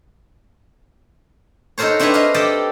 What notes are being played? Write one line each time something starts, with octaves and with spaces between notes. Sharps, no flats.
D#4 F#4 A4 A#4 C5 C#5
C4 D4 E4 G#4 B4 C#5
D#5 F5
G4 A4 D5 D#5 G5 A5